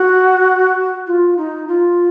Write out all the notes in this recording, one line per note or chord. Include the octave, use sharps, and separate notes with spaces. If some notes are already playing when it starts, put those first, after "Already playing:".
Already playing: F#4
F4
D#4
F4